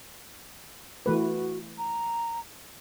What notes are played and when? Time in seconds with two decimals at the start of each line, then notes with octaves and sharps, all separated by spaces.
1.06 E3 A3 F#4 B4
1.78 A#5